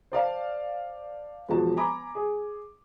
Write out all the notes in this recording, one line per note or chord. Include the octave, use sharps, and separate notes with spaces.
C5 D5 F5 A5
E1 F3 F#4 A5
G#5 A#5 B5 D6
G#4